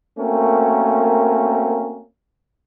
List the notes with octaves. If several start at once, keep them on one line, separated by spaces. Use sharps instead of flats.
A3 A#3 C4 C#4 F#4 A#4